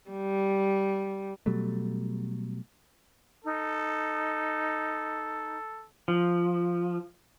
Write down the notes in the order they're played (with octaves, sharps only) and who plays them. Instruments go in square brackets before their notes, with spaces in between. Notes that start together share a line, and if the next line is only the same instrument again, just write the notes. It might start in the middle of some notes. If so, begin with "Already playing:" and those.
[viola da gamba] G3
[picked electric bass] B2 F#3 G3 A3
[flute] D#4 [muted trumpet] A4
[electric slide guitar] F3